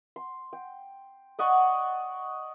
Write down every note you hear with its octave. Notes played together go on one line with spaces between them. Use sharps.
C6
G5
D5 D#5 F#5 C#6